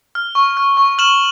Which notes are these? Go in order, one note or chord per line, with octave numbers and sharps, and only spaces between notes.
F6
C#6
F6
C#6
F6 E7 F#7